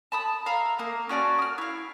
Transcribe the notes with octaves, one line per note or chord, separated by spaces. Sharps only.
A5 B5 D#6
E5 F5 A#5
A#3 D#6
C#4 F#4 D5 A5
D#6 F6
E4 F5